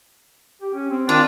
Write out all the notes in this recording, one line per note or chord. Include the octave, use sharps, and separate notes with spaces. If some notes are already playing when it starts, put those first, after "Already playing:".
G4
C#4
C4
D#3 D4 F4